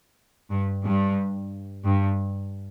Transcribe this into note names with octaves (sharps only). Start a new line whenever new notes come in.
G2
G2
G2